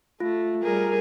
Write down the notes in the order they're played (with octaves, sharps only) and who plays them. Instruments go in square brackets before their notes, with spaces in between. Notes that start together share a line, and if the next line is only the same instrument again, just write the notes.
[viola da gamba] A3 [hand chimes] F4
[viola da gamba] G3 G#4 [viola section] A#4